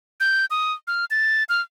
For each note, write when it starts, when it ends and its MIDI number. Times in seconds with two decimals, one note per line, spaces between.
0.20 0.46 91
0.51 0.73 87
0.87 1.05 89
1.11 1.44 93
1.49 1.62 89